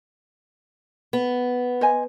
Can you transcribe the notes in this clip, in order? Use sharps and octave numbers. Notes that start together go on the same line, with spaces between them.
B3
C5 D#5 G#5